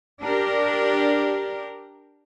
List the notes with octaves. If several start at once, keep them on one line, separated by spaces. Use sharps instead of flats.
D4 G4 A#4